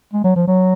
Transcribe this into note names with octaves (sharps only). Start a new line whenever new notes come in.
G#3
F#3
F3
F#3